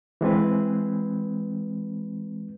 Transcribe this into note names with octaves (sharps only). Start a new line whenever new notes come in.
E3 G#3 C4 B4